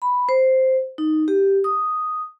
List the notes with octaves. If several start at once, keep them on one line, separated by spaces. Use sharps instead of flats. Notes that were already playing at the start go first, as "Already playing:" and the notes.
B5
C5
D#4
G4
D#6